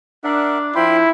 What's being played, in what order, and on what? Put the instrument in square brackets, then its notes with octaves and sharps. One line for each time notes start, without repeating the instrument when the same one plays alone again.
[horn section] D4 [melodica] A#4 E5 F#5
[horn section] F3 [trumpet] E4 [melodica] G5 B5 C6